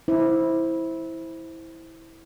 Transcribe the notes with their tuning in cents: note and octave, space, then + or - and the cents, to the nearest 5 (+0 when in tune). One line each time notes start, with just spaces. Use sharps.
E4 -10 C5 +0